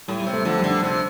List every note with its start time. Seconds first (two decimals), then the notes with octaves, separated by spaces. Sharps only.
0.08 A2 G3
0.20 G3
0.27 C3
0.33 A3
0.45 D3 F3
0.57 G3
0.64 D3
0.70 D4
0.83 C3 D4